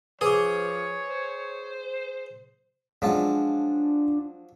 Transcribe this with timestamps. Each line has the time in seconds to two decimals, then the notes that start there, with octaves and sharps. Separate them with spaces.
0.21 F3 G#4 B4 C#5 D6
1.09 C5
3.02 F3 F#3 G#3 D4 A4